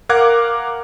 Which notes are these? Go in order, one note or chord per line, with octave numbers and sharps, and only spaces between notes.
A#4 F5 F#5 D6 F#6 G#6